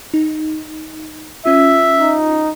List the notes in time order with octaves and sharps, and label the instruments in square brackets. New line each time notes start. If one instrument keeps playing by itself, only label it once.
[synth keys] D#4
[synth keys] C#4 F4 [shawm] E5
[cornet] D#4